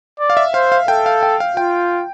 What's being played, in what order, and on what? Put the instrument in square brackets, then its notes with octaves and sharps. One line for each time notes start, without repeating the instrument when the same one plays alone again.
[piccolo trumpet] D5
[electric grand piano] F5
E5
[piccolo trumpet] C5 [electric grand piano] F5
[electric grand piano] F5
[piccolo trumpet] A4 [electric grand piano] G5
[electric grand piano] F5
G5
F5
[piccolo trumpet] F4 [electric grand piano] G5